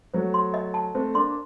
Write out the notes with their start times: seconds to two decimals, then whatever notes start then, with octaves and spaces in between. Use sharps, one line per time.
0.14 F#3 A3 C5
0.34 C6
0.54 D#5
0.74 A5
0.95 A3 C4 C5
1.14 A#3 D4 C6